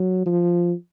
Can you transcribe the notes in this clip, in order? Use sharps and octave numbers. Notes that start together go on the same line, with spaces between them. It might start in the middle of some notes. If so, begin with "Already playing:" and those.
Already playing: F#3
F3